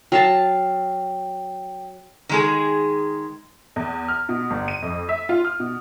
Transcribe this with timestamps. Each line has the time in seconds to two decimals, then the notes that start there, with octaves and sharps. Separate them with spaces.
0.12 F#3 F5 G5 A5
2.29 D#3 G#3 G#4
3.76 E2
4.08 F6
4.29 B2
4.50 G1
4.68 D#7
4.82 F2
5.09 E5
5.29 F4
5.45 F6
5.60 B2